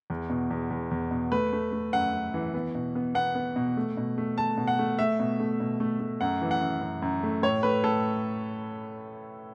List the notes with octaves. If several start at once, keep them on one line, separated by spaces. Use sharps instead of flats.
E2
B2
E2
E2
E2
B2
A3 B4
A3
A3
F#2 F#5
F#2
E3
B3
B2
B3
B3 F#5
B3
B2
A3
B2
A3
A3 A5
B2
F#5
A3
A3 E5
B2
A3
B2
A3
A3
F#2 F#5
E3
F#5
F#2
F#2
F#2
A3
A2 C#5
A3 B4
A2 A4